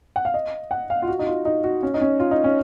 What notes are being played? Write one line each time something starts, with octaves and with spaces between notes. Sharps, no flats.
F#5
F5
D#5
F#5
F5
F4
F#4
D#4
F4
D#4
F#4
C#4
D#4
C#4
F4
D#4
C#4